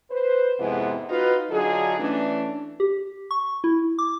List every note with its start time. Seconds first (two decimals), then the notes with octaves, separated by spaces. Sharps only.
0.11 B4 C5
0.59 F2 G#2 C3 G#3 B3 E4
1.09 D#4 F4 F#4 B4
1.50 D3 F#3 D#4 F4 G#4
1.99 E3 A3 C#4 D4
2.80 G4
3.31 C#6
3.64 E4
3.99 D6